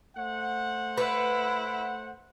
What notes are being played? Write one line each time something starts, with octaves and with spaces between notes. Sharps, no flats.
A3 C5 F#5
E4 B4